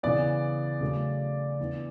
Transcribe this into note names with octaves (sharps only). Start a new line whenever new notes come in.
C#3 E3 B3 D5
C#3 F#3 A3
E3 B3 D4